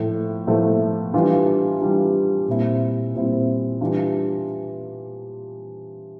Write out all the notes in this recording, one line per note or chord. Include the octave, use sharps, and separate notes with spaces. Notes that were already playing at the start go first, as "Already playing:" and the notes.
Already playing: A2 F3 A3
A2 F3 A3
E3 G3 D4 F4
E3 G3 D4 F4
A#2 G3 C4 E4
A#2 G3 C4 E4
E3 G3 D4 F4